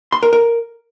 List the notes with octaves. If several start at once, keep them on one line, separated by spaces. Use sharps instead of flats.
C6
A#4
A#4